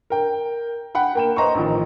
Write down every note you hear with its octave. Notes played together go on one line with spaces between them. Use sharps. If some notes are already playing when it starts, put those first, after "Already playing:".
A#4 G5
F#5 G5 B5
A#3 G5 E7
B4 C5 D#5 A#5 C6 C#6
A1 D#3 F3